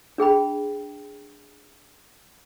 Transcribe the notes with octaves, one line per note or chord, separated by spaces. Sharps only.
D4 G#4 G5 B5